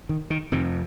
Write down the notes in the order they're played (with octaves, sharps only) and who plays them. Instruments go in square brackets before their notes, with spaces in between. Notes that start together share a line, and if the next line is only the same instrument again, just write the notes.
[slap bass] D#3
D#3
F2 C3 D#3